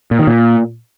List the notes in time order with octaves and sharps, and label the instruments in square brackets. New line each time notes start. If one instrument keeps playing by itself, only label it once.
[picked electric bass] A#2
D#3
A#2